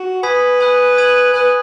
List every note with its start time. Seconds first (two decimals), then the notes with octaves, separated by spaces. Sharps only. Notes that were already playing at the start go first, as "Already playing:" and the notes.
Already playing: F#4
0.23 B4 G#5 B5 D#6 G#6 B6
0.60 G#5 B5 D#6 F#6
0.97 D#6 G#6 D#7 F#7
1.34 B4 G#5 D#6 F#6